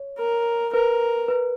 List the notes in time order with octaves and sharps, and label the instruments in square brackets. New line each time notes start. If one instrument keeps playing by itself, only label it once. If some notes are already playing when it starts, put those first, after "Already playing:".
Already playing: [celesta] C#5
[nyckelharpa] A#4
[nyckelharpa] A#4 [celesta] B4
[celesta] B4